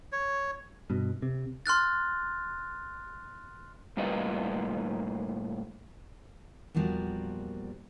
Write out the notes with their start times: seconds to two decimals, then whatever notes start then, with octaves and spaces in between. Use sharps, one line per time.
0.12 C#5
0.90 G2 B2
1.22 C3
1.66 C6 F6 F#6 A6
3.97 A2 G3 A#3 F4 B4 D#5
6.75 E2 A#2 F3 G3 F#4 A#4